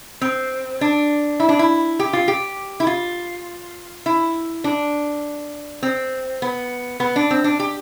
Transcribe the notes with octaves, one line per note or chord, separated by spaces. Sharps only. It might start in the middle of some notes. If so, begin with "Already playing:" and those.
C4
D4
E4
D4
E4
G4
F4
G4
E4
F4
E4
D4
C4
B3
B3
D4
C4
D4
G4